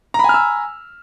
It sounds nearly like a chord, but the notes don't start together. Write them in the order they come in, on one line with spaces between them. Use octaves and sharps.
A#5 B5 G#5 F6 E6